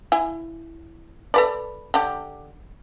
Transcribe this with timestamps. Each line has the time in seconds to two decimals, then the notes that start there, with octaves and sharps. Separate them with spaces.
0.12 E4 G#5
1.34 A4 B4 D5
1.94 D3 G4